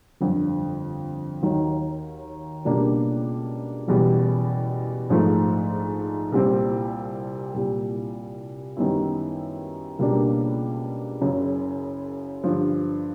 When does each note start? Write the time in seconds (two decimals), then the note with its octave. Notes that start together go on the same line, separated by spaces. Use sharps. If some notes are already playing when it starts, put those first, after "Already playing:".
0.21 G1 F2 D3
1.43 D#2 D#3 F#3
2.65 C#2 B2 G3 A#3 D4
3.88 F#1 E2 B2 G3
5.10 A#1 G#2 F3 A3
6.32 C2 A#2 G3 C4
7.54 C2 A#2 G3
8.77 F#2 D#3 G3 B3 E4
9.99 C#2 B2 G3 A#3 D4
11.21 F#1 F#2 C#3
12.44 G2 D3 F3